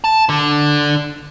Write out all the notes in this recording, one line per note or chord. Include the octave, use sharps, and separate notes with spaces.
A5
D3